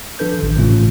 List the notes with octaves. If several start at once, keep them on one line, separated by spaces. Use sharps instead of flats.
F3 D4 A4 B4 G6
A1 D#3
A2 C#3 E3 A3 C#4 F4